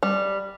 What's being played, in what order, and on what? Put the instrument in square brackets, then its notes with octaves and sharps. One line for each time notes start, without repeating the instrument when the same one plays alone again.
[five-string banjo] G3